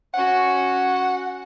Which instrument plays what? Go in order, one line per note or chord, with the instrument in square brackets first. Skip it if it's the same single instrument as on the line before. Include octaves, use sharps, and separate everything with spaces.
[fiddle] C#4 F#4 [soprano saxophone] F#5